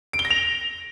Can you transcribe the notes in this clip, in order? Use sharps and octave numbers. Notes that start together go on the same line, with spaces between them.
D7
G7
A#6
F7